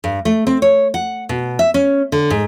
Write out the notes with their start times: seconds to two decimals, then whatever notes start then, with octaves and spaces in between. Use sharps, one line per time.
0.04 G2
0.25 A3
0.47 C4
0.62 C#5
0.94 F#5
1.29 B2
1.59 E5
1.74 C#4
2.12 D3
2.30 G#2